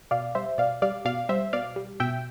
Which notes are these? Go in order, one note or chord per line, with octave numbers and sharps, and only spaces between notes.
B2 D5 F5
G3 C5 E5
B2 D5 F5
G3 D5 F5
B2 D5 F5
G3 C5 E5
B2 D5 F5
G3
B2 E5 G5